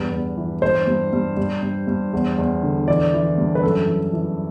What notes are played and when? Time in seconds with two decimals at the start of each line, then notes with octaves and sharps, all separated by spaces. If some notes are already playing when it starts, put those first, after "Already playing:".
Already playing: E2 G2 B4
0.11 E2
0.37 E3
0.62 G2 C5
0.87 G2
1.13 G2
1.37 G2
1.62 G2
1.88 G2
2.13 E2
2.38 E2
2.63 D3
2.88 E3 D5
3.14 E3
3.38 G2
3.55 B4
3.63 F#2 A4
3.88 E3
4.13 E3